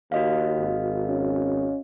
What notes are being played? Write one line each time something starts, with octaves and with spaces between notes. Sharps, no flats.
D#2 F#4 D#5 F5
G#1
C#4